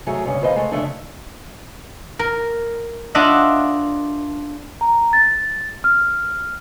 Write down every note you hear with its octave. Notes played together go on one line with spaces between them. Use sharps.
G#2 F#3 A3 G#4
G2 C#3 C#4
D#2 G#2 B4 C5 D#5 F5
G#3 A3
F2 C#3 F3 A3 D4
A#4
D4 F4 D#5 E5 F#5
A#5
A6
F6